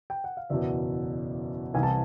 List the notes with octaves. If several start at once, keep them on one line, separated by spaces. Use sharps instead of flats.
G5
F#5
F5
F#1 E2 B2 D5 E5
C2 C3 E3 G#5
A5